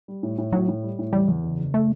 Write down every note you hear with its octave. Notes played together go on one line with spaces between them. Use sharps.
G3
A2
A2
A2 F#3
A2
G3
A2
E2 G3
E2
F#1
F#1
A3